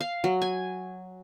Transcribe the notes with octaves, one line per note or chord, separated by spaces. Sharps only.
F5
F#3
G#5